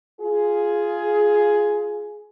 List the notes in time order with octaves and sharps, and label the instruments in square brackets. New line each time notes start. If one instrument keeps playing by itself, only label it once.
[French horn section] F4 G#4